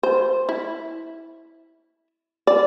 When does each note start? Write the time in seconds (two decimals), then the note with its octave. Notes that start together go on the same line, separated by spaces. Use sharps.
0.03 C5
0.49 E4
2.47 D5